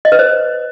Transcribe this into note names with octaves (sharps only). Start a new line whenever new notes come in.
D#5
B4
C5